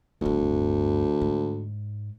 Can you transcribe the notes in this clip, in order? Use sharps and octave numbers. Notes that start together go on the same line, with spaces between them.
D1 D2 G2
G#2